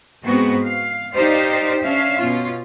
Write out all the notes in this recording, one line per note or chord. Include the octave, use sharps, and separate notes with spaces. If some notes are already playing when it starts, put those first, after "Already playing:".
G#2 G#3 B3 C4 F#4
F5
D#4 G4 C5 D5 F5
C#4 D4 E5 F5
B2 C#4 F4